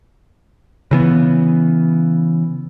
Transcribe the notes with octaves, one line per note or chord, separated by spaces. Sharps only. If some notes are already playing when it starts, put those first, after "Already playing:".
C#3 E3 B3